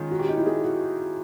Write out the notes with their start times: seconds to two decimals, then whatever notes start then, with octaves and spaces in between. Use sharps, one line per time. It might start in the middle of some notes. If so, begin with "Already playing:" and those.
Already playing: D#3 G#3 C#4 F4
0.11 F#4
0.19 G4
0.29 D#4
0.37 E4
0.46 G#4
0.64 F#4